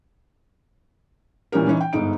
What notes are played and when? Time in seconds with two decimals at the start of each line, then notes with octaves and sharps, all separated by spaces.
1.52 A#2 E3 C#4 G4 A#4
1.67 E3 C#4 D#4
1.81 G5
1.93 G1 G#2 D#4 D7